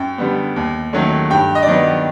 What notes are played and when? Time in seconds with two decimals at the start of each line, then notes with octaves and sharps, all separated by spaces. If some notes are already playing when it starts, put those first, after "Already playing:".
Already playing: F#2 G5
0.18 D3 G3 B3
0.56 D#2
0.93 D#3 F#3 A3 C#4
1.30 G2 G5
1.55 D#5
1.62 D5
1.67 D#3 F#3 B3 D#5